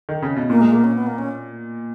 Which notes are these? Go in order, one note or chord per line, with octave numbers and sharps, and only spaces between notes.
D#3
C#3
B2
A#2 A#3
G#3
A#3
C#4
B3
A#3
C#4